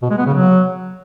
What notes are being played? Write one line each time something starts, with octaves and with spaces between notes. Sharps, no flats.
B2
G#3
B3
C#3
F#3